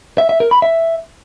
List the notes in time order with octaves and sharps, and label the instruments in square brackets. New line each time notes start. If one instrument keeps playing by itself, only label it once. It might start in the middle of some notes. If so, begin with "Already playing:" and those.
[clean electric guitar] E5
E5
A#4
B5
E5